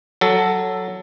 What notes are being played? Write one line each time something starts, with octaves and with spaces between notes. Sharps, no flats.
F#3 A4